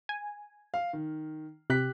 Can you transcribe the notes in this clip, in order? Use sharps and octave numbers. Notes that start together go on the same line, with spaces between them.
G#5
F5
D#3
C3 G4 F#6 B6